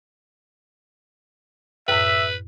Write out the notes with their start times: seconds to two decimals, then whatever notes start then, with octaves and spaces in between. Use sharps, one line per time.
1.88 F#2 A2 B4 E5